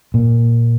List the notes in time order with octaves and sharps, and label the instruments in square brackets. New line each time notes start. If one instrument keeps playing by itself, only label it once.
[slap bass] A#2